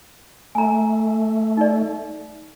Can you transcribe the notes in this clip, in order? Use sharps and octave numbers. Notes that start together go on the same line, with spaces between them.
A3 G#5 A#5
D#4 D5